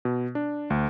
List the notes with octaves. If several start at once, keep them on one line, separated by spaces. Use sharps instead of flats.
B2
D4
D2